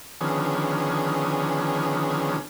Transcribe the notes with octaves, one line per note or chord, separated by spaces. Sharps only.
D3 D#3 F3 B3 C#4 G#4